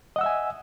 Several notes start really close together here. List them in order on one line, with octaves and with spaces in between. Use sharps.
D#5 F#5 E6 E5 G#5